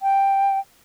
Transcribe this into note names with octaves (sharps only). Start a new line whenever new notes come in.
G5